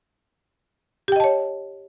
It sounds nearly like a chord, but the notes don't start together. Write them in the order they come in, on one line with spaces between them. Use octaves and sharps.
G4 G5 D#5 A5 C#5